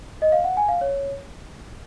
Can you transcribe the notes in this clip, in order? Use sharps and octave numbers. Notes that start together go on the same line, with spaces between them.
D#5
F5
F#5
G#5
F5
C#5